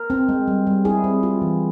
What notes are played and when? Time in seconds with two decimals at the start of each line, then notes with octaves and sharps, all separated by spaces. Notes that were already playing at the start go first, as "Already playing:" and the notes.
Already playing: A#4
0.10 C4
0.29 G#3
0.48 G3
0.67 G3
0.85 E4 G#4
1.04 C4
1.23 F4
1.42 E3